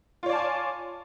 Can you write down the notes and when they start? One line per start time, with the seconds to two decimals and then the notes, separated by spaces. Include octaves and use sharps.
0.23 F4
0.26 C#5
0.29 D5
0.32 A5
0.35 G#5